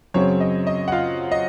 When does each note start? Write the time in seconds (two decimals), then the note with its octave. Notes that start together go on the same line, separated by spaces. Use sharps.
0.14 F#2 C#3 F#3 C4 C#5
0.40 D#5
0.67 D#5
0.88 F#5
0.92 F4 F5
1.31 D#5